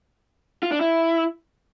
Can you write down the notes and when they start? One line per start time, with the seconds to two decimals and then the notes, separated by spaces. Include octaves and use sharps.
0.63 F4
0.72 D4
0.81 E4